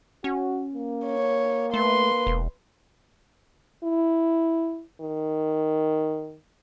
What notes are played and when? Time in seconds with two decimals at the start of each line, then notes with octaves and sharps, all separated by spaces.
0.24 C#4 F#4
0.74 A#3
1.06 C#5
1.74 A3 B4 C6
2.27 E1
3.84 E4
5.01 D#3